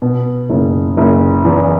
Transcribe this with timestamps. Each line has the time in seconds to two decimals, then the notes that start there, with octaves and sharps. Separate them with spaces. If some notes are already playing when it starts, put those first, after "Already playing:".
0.02 B2
0.50 F#1
0.97 F#1
1.45 E2